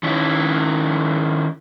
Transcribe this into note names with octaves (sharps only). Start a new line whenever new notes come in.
D#3 C#4 E4